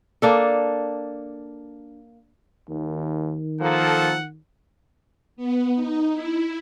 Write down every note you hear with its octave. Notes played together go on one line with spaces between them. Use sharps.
A#3 D4 A4
D#2 D#3
F3 A#3 A4 F#5
B3
D#4
E4